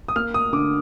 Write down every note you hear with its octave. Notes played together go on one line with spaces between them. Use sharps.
D#6
A#3 F6
D#6
D3 D6